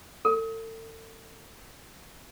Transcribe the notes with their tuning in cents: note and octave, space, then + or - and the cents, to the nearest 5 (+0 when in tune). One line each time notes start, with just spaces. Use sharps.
A4 +35